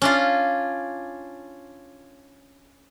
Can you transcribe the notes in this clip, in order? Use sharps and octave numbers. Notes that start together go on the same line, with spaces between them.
C#4 D4 F4